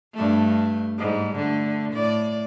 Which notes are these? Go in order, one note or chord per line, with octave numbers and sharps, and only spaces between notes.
G2 A3
G#2 G3
D3 A3
A2 D5